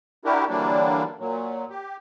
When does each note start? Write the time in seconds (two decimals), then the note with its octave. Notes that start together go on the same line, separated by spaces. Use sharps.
0.25 D4 E4 F#4 G4 A#4
0.49 D3 E3 F#3 G3 A#3 D4
1.19 A#2 F#3
1.70 G4